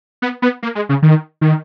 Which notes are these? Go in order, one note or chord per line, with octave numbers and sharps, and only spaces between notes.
B3
B3
A#3
G#3
C#3
D#3
D#3